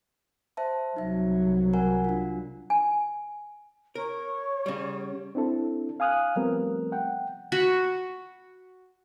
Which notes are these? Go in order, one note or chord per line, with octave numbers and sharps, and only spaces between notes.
C5 E5 A5
C2 F#3 D#4 E5
A#4 F#5 G#5
D4 F4
G#5
A#4 C#5
C#3 G3
C4 D4 E4 A4
F5 G#5 D#6 F6 F#6
F3 G3 A3 B3 C4 A#4
F#5 G5
F#4 B5